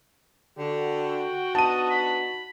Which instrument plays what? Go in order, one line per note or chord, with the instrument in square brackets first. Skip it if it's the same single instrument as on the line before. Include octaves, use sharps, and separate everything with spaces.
[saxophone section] D3 [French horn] F#4 [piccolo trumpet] G5
[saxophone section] B3 D4 D#4 [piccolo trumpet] D#5 [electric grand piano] A5 D#7
[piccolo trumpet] B5